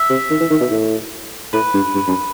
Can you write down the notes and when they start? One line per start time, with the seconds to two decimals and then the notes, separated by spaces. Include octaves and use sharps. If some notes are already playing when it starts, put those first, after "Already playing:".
Already playing: E5
0.10 C3
0.30 D#3
0.40 E3
0.51 D#3
0.61 B2
0.71 A2
1.53 A2 B4
1.74 G2
1.94 G2
2.08 F#2